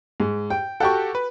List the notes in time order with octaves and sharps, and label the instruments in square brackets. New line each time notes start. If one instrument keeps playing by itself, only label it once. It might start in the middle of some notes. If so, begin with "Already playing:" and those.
[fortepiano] G#2
G5
[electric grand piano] F#4 G4 A4 [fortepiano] F#5 G5 C#6
[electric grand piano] B4